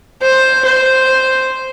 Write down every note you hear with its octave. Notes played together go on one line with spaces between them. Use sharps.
C5
C5